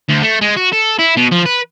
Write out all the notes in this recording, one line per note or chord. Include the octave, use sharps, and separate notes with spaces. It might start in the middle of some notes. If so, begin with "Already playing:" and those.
D2
A3
G#3
F#4
A4
E4
B2
F3
B4